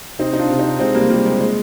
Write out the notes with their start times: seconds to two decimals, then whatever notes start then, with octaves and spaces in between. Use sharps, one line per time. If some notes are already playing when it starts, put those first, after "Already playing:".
0.19 C3 C4 D#4
0.33 D#4
0.39 D4 F4
0.49 C3
0.59 C4 D#4
0.80 C3 G#3 C4
0.95 G3 A#3
1.10 F3 G3 A#3
1.26 G#3
1.41 A#2 G#3